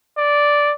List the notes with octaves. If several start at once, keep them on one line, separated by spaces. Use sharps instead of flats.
D5